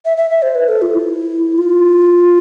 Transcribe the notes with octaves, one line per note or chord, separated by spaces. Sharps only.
E5
E5
E5
C5
B4
A4
F4
E4
F4